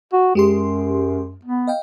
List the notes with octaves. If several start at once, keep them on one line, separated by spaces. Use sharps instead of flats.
F#4
F#2 G#3 G4 C6
B3
D#5 F5 G5